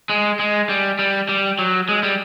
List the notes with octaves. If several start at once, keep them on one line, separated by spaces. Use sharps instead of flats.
G#3
G#3
G3
G3
G3
F#3
G#3
G3